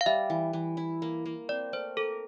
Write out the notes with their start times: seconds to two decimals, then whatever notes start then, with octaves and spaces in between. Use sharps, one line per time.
0.01 F5
0.06 G3 E5
0.30 E3
0.53 E3
0.77 E4
1.02 A#3
1.26 A#3
1.49 C4 D5
1.73 A3 C5
1.97 A4 A#4